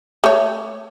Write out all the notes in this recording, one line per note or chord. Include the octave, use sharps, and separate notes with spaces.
A3 C#5